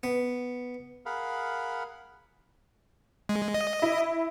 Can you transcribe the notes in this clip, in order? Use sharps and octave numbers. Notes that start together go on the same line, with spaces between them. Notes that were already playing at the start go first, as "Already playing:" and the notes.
B3
G#4 A#4 F5 F#5 B5
G#3
D#5
E4